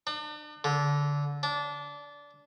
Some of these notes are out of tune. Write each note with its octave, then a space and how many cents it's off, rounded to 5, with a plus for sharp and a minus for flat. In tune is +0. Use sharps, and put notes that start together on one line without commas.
D4 +40
D3 -20
D4 -20